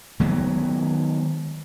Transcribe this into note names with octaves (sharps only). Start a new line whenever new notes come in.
D#3 F#3 G#3 B3